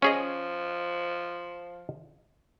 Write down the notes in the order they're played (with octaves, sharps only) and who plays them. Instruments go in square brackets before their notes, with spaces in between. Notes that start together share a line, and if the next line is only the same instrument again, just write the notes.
[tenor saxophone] F3 [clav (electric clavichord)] C#4 G#4 D#5